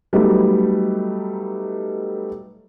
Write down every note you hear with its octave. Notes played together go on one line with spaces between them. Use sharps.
F#3 G3 A3 B3 D#4